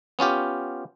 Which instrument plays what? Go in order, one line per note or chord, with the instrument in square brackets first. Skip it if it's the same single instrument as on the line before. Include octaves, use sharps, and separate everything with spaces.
[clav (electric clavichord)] B3 C#4 F4 G4